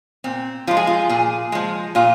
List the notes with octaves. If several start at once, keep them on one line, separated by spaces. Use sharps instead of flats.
A#2 C4
F3 G#3 F4
G#4
F4
A#2 G#4
F3 G#3
A#2 F4